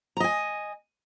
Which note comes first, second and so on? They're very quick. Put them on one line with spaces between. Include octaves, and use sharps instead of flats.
A#5 D#5 G#5